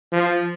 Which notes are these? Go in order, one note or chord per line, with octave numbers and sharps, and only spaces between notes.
F3